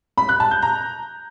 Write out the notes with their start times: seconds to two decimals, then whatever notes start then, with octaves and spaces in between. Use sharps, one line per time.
0.17 B5
0.29 F#6
0.40 A5
0.51 G6
0.62 A#5